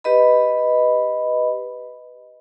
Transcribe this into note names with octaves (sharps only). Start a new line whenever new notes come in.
G4 B4 D#5 B5